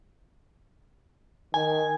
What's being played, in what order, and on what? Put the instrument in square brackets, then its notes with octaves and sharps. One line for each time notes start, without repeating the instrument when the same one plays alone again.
[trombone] D#3 [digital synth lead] G#5